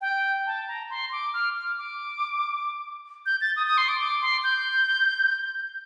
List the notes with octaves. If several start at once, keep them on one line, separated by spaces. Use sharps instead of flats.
G5
A5
A#5
C6
D6
F6
F6
D6
G6
A6
D#6
D#6
C6
D6
D6
C6
G6